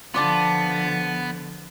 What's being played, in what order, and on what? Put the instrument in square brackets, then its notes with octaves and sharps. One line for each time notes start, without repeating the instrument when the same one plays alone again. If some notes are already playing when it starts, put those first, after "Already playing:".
[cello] D3 F3 [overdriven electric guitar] B3 [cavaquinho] F4 D5 A5